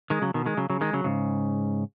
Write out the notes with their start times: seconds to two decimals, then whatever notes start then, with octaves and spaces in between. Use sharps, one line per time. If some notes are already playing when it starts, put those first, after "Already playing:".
0.10 D#3 G#3
0.22 C#3 F#3
0.34 B2 D#3
0.46 D#3 G#3
0.57 C#3 F#3
0.70 C#3 F#3
0.81 D#3 G#3
0.93 C#3 F#3
1.04 G#2 C#3